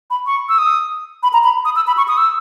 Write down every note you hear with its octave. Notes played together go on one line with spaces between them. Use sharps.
B5
C#6
E6
D#6
B5
A#5
B5
D#6
E6
B5
C#6
D#6
E6